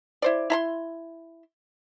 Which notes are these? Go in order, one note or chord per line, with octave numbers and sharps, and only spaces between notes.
E4 C5 D5
E4 A#5 C6